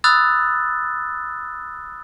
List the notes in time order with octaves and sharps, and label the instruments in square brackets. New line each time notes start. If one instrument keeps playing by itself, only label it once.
[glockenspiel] B5 D#6 E6 F#6 A6